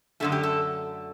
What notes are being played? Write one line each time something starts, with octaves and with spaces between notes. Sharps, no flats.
F#2 D3 A3 A4
G4
A4